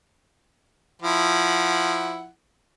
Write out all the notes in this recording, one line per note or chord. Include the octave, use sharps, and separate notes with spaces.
F3 E4 F#5